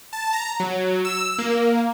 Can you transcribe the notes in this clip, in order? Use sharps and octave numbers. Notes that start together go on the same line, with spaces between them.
A5
A#5
F#3
E6
A#3